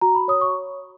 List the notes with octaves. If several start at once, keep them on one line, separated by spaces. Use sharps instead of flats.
F#4 A#5
B5
C#5 D#6
C#6